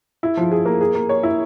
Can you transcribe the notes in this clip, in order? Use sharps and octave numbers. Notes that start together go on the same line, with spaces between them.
E4
F3
G#4
A#3
G#4
A#3
C#5
E4